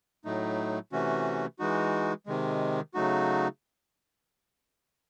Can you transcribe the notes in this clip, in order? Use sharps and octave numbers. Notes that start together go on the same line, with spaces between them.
A2 F#3 A3 D#4
C3 E3 A3 C#4 F#4
E3 G#3 D#4 F#4
C3 D#3 G#3
C#3 F#3 A3 D#4 F#4